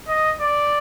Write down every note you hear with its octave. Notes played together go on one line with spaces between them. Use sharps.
D#5
D5